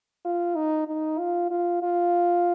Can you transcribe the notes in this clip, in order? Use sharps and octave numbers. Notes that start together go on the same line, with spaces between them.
F4
D#4
D#4
F4
F4
F4